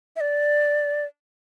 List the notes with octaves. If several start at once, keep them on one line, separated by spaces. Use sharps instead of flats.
E5
D5